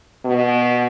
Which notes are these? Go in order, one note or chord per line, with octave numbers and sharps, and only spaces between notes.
B2